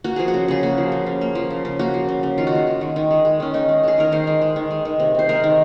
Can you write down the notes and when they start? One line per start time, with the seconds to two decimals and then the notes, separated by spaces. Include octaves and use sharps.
0.04 A#3 F#4
0.16 F3 G#4
0.28 F#4
0.34 C#3
0.48 C#3 G#4
0.63 A#3 F#4
0.78 F3
0.92 C#3
1.06 C#3
1.21 A#3
1.35 F3
1.50 C#3
1.65 C#3
1.79 A#3 F#4
1.94 F3
2.09 C#3
2.23 C#3
2.38 D#3 F4
2.47 F#4
2.53 G#3 F4
2.67 G#3
2.81 D#3
2.96 D#3
3.11 G#3
3.25 G#3
3.40 D#3 C#4
3.54 D#3 D#4
3.69 G#3
3.83 G#3 G#4
3.98 D#3 A#4
4.12 D#3 C5
4.27 G#3
4.41 G#3
4.56 D#3
4.71 G#3
4.85 D#3
5.00 C3
5.14 C3 C5
5.29 G#3 A#4
5.44 D#3